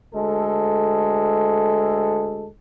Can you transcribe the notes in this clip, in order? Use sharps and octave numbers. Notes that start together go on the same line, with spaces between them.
D2 G#3 A4